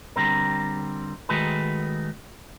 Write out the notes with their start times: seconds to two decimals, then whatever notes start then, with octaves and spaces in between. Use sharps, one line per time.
0.16 D3 G3 C4 A#4
1.29 D#3 G#3 A3 F#4 G#4 B4